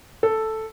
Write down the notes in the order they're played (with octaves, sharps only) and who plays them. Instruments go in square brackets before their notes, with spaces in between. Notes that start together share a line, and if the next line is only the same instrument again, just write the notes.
[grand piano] A4